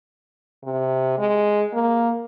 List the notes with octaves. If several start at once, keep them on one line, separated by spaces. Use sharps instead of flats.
C3
G#3
A#3